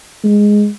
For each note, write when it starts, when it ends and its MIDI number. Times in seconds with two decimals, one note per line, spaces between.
0.24 0.69 56